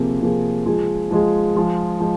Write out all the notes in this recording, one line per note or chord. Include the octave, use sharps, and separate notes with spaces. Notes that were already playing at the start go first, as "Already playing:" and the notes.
Already playing: C3 F3 A#3 G#4
C3 F3 A#3 G#4
F3 G#3 F4 G#4
F3 G#3 F4 G#4
F3 G#3 F4 G#4
F3 G#3